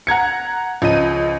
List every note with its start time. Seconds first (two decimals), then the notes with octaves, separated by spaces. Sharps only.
0.07 F#5 A#5 G#6 C#7
0.82 C#2 F3 D#5 D#7